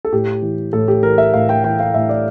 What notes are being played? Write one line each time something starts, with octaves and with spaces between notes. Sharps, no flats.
A4
A2 G4
E3
A2 A4
G4
E3 A#4
E5
A2 F5
G5
E3 G5
F5
A2 E5
D5